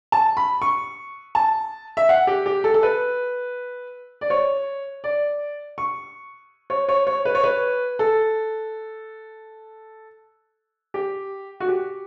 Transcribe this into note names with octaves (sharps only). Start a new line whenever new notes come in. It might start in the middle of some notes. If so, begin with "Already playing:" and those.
A5
B5
C#6
A5
E5
F#5
G4
G4
A4
A4
B4
D5
C#5
D5
C#6
C#5
C#5
C#5
B4
C#5
B4
A4
G4
F#4
G4